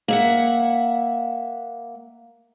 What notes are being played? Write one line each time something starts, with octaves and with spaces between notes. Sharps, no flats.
A#3 E5 F#5